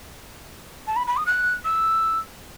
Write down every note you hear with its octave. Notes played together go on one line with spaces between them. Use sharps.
A5
B5
B5
D#6
F#6
E6